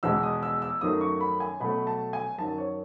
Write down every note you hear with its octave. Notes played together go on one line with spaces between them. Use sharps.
E2 B2 G#3 E6
D#6
E6
E6
F#2 D#3 F#3 A3 D#6
C#6
B5
G#5
B2 F#3 A3 B5
A5
G#5
F#2 D#3 F#3 A5
C#5